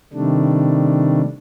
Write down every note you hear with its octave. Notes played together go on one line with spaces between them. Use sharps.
C3 D#3 G3 A3 D4